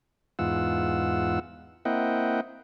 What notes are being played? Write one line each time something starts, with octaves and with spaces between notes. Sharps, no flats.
E2 G#2 F4 F#5 E6
A#3 C4 E4 D#5 F#5 G5